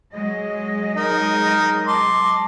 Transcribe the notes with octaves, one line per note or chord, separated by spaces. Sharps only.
F#3 G#3 D#5
D#4 A#4
A5 C6 D6